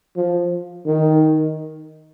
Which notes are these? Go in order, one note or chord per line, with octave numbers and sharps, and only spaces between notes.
F3
D#3